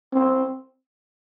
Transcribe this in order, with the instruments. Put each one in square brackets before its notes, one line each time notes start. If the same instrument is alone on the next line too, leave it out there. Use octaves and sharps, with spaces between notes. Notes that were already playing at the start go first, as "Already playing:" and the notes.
[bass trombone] C4